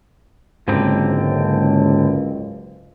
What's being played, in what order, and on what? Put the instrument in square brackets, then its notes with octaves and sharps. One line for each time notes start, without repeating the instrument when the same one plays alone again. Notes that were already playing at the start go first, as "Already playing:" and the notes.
[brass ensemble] F#1 C#2 [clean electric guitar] G#2 D3 C4